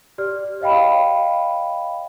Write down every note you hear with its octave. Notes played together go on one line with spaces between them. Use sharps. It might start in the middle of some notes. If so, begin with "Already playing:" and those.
G4 D5 F6
C#5 D#5 F5 G5 B5